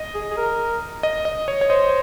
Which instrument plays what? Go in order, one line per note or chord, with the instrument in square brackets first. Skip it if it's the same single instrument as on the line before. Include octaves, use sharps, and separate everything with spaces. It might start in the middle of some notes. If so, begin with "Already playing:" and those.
Already playing: [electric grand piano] D#5
[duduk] G#4
G#4
A#4
[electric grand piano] D#5
D#5
C#5
C#5
[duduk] C5 [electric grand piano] D#5